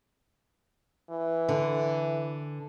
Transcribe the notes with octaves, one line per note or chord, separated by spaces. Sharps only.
E3
D3